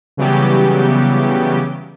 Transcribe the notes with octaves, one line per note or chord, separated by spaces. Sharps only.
C#3 E3 F#3 G3 B3 G4